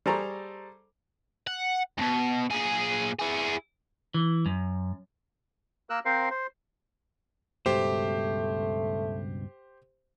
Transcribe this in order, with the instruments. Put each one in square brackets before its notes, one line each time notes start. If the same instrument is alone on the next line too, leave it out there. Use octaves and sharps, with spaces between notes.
[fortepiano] G3 G#4 A4 C5 A#5 C#6
[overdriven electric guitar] F#5
D2 B2
A#2 G#4
E4 G#4
[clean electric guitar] E3
F#2
[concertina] A#3 A#4 E6 F#6
C4 A#4 C5 F5
C5
[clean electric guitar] C#2 G2 B2 [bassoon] A3 [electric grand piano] G4 C5